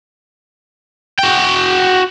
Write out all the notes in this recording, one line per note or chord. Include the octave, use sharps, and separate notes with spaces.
F#4 G5